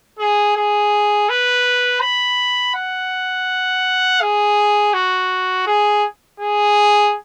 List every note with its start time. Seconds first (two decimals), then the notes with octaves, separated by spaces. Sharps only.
0.19 G#4
0.56 G#4
1.29 B4
2.01 B5
2.75 F#5
4.21 G#4
4.94 F#4
5.67 G#4
6.40 G#4